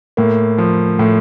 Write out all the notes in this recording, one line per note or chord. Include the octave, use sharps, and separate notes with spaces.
A2 A#3
F3
A2